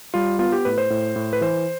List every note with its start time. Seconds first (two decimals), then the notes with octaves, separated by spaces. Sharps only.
0.14 G3 F4
0.39 B3 F4
0.52 G4
0.65 A2 B4
0.78 C5
0.90 A2
1.16 A2
1.33 B4
1.41 E3 C5